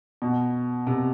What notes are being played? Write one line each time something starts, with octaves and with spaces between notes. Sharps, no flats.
B2
C3